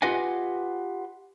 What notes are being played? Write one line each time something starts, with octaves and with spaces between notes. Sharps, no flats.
F4 G4 B4 D#5 F#5 G#5